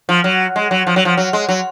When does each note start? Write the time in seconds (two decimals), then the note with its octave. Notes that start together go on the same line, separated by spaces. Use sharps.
0.09 F3
0.24 F#3
0.56 G#3
0.71 F#3
0.87 F3
0.96 F#3
1.05 F3
1.18 F#3
1.33 G#3
1.49 F#3